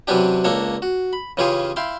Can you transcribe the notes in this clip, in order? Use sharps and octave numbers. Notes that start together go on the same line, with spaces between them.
C3 E3 F#3 C#4 D4 G4
C#2 A#3 D4 A4 C#5
F#4
B5
C#3 E3 C#4 F4 G4 G#4
E4 F5 G5 C6